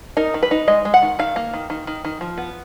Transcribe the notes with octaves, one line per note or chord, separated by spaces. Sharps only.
D#4 A#4
D#3
B4
D#4
G#3 D#5
G#3
F#5
D#3
D#3 F5
A#3
D#3
D#3
D#3
D#3
F3
B3